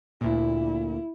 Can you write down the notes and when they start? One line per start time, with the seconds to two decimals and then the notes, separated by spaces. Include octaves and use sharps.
0.21 D2 A#2 E4